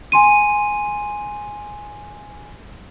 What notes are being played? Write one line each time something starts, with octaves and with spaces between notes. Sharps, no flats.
G#5 C6 D#7